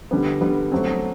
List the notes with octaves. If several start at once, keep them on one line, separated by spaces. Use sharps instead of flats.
D3 G3 B3
D3 G3 B3
F#3 A3 C4